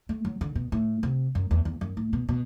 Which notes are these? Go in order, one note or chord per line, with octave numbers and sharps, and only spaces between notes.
A3
F#3
D3
B2
A2
C3
F#2
E2
E2
F#2
A2
B2
B2